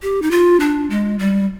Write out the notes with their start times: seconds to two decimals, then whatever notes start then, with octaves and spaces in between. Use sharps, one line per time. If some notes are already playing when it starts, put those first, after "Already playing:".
0.02 G4
0.22 D#4
0.31 F4
0.60 D4
0.90 G#3
1.19 G3